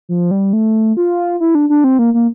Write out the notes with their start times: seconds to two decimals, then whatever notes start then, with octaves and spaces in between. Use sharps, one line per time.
0.09 F3
0.31 G3
0.53 A3
0.97 F4
1.40 E4
1.55 D4
1.69 D4
1.84 C4
1.99 A#3
2.14 A#3